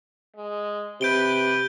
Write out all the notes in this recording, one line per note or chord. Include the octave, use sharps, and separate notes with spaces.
G#3
C3 B4 G6 D7 G7